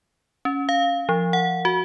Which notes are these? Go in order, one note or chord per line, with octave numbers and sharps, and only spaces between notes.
C#4
F5
F3
F#5
F#4